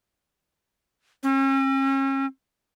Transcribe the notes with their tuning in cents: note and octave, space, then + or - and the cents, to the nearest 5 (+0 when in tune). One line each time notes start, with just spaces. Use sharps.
C#4 -40